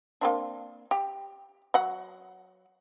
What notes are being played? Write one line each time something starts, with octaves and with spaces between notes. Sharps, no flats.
A#3 C4 D4
G4
F#3 F#5